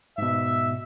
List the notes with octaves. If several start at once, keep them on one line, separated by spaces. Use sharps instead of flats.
G#2 B2 E5